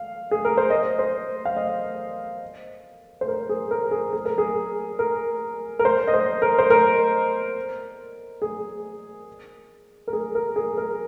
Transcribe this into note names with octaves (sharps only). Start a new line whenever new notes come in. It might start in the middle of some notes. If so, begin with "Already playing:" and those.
Already playing: F5
G#4
A#4
C5
D#5
C5
F5
D#5
C5
A#4
G#4
A#4
G#4
G#4
A#4
G#4
A#4
A#4
C5
D#5
C5
A#4
C5
A#4
G#4
A#4
G#4
A#4
G#4
A#4